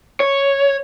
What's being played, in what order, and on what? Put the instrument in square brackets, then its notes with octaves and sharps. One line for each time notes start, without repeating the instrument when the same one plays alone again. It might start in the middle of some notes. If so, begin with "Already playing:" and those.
[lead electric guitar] C#5